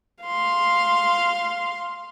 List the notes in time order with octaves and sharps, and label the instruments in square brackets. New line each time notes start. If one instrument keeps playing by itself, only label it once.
[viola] F5 C6